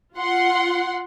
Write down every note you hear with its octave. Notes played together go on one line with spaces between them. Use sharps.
F4 F#5 C6